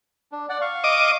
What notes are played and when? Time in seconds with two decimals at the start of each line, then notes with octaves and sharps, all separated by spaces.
0.32 D4
0.49 D5 F#5
0.61 F5 C#6
0.84 D#5 D6